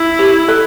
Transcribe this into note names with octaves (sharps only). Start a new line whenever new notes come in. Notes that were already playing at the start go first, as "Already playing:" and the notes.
Already playing: E4
G4
A4